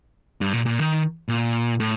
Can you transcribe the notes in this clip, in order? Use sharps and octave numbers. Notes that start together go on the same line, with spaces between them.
G2
A#2
A#2
D#3
A#2
A2